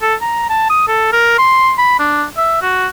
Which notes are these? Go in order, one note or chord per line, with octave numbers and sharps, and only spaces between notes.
A4
A#5
A5
D#6
A4
A#4
C6
B5
D4
E5
F#4